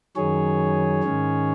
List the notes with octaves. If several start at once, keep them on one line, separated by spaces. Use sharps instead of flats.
F#2 D#3 F#3 G#4 C#5
G#2 D#3 G#3 C#4